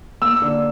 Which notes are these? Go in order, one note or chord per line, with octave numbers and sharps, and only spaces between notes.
A#3 E6
D3